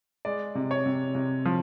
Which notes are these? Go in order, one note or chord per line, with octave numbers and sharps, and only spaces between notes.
G#3 D5
C3
C#5
C3
C3
F3